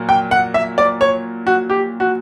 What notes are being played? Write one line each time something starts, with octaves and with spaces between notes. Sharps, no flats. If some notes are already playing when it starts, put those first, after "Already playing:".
Already playing: A#2 F#3 A#3
G5
F#5
E5
D5
C#5
F#4
G4
F#4